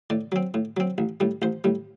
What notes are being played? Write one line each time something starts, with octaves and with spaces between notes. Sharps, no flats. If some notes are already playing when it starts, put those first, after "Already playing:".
A2 D5
F#3 C4
A2
F#3 C4
A1
A2 G3
A1 C5
A2 G3